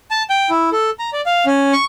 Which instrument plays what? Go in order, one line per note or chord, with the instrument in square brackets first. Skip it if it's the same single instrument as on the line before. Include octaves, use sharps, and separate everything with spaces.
[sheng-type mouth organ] A5
G5
E4
A4
A#5
D5
F5
C#4
C#6